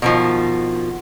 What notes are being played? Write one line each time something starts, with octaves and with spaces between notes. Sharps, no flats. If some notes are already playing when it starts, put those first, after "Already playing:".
B2 D#3 F3